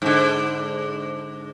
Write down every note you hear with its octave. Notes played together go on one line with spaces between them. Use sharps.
G#2 D3